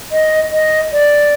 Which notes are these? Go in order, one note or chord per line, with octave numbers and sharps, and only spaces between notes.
D#5
D#5
D5